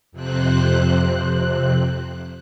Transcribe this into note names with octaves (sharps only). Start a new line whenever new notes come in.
F2 C3 C4 F#6